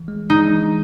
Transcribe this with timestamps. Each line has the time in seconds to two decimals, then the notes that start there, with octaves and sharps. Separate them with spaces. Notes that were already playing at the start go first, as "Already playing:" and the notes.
Already playing: E3
0.08 G#3
0.30 G#3 D#4
0.52 E3